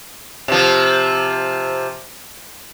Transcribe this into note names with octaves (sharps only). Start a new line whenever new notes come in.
C3 F3